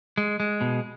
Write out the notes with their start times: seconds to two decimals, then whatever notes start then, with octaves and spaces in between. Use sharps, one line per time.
0.17 G#3
0.40 G#3
0.61 B2